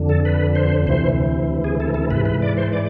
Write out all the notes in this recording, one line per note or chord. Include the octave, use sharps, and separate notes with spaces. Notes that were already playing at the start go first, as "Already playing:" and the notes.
Already playing: F2 D3
A4
B4
C5
D2 C3 E3 C5
G#4
A4
A4
G#2 E3 B4
B4
D5
C5
D5